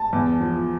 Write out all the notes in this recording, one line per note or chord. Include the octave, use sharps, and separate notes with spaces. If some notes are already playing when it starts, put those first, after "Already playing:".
Already playing: A5
E2
F3